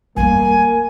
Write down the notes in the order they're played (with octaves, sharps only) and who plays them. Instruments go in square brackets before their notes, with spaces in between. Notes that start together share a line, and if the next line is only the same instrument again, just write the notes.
[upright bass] G3 A3 [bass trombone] A#3 [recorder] G#5